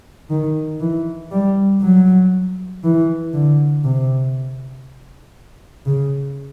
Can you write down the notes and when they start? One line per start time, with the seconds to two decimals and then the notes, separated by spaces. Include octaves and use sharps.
0.30 D#3
0.80 E3
1.31 G3
1.81 F#3
2.83 E3
3.33 D3
3.84 C3
5.86 C#3